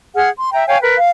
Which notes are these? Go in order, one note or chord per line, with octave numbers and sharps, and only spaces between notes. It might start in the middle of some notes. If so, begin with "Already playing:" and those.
G#4 F#5 F6
C6
E5 G5 A#5
C#5 F5 G5 G#5
A#4 B4
F5